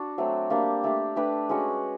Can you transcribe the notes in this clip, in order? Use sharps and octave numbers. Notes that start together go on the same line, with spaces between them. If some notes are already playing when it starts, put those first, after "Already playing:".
Already playing: D4 F#4
F#3 A3 C4
G3 A#3 D4 G4
A3 D4 G4
A3 D4 G4 B4
G#3 C#4 F#4